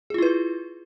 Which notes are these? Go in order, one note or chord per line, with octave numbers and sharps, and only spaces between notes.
E4 F4 G#4 B4